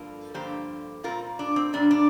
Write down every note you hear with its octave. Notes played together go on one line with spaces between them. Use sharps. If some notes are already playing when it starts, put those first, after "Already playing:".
Already playing: G2 D3 F3 A#3 F4 A#4
G2 D3 F3 A#3 G4 C5
A#2 G3 C4 F4 A#4
D4
C4
A#2 G3 C4 D4
D4